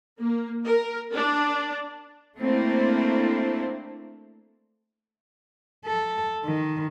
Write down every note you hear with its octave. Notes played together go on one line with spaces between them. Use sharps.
A#3
A#4
D4
A3 A#3 C4 D4 E4 C5
A4
D#3